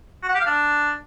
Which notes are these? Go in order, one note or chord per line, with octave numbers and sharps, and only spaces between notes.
F#4
F#5
G4
F5
D4